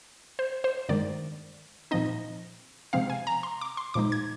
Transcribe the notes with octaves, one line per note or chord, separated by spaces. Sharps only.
C5
C5
G2 D#3 G#3 D5
A#2 F3 C4 D#4 D#5
C3 F3 G#3 C4 F5
G#5
A#5
C6
D6
C6
A#2 F3 G#3 D#4 D6
G#6